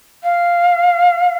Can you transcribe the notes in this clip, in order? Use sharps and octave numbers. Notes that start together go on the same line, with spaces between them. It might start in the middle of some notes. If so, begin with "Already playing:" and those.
F5